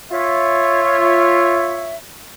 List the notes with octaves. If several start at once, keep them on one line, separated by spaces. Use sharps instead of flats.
F4 C#5 E5